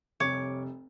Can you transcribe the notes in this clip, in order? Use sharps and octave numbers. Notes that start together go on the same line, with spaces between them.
F1 C2 C#5 D6